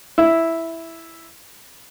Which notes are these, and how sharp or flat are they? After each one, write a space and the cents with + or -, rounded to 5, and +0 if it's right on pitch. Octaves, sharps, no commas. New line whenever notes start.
E4 +0